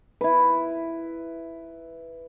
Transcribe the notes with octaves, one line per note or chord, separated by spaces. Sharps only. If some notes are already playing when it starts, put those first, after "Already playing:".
E4 B4